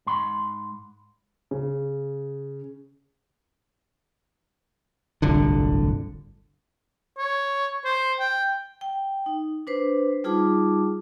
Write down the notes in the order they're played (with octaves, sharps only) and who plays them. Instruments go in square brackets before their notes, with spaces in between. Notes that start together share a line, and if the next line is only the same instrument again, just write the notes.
[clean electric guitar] G#2 B5 C6
[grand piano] C#3
[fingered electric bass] D1 G1 C2 D3
[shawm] C#5
C5
G5
[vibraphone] G5
D#4
D4 B4 C5
G3 D#4 F4 G#4 A5 D6